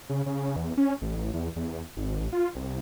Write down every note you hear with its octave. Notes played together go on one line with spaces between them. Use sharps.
C#3
C#3
E2
C#4
A1
A1
E2
E2
G#1
A1
F4
C2